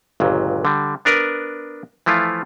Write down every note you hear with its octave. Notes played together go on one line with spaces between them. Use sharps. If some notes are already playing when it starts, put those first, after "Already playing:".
G1 C#2 A#2 F#3
D3 G3
B3 D4 A#4 B4
E3 F3 A3 E4 F4